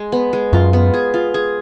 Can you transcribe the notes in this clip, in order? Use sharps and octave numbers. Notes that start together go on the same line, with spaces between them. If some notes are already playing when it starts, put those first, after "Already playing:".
Already playing: G#3
B3
G#3
F#2 F4
B3
G#4
F4
G#4